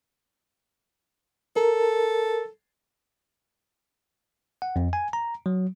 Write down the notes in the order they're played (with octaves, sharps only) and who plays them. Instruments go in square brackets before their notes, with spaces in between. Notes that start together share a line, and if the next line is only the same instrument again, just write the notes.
[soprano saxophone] A4 [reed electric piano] A#4
[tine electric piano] F#5
F2
G#5
A#5
F#3